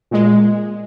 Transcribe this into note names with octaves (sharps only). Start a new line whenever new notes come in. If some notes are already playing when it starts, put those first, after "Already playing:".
A#2 G#3